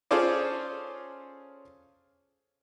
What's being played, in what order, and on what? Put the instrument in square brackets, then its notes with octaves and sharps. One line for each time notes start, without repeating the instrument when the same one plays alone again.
[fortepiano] C#4 F4 G#4 A4 C5 D5